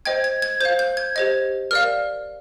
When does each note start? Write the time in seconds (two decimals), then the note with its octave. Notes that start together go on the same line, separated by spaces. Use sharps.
0.05 C5 D#5 G5 G#6
0.24 G#6
0.42 G#6
0.61 C5 F5 G6
0.79 G6
0.97 G#6
1.16 G4 C5 D#5 G#6
1.71 A#4 D5 F5 F6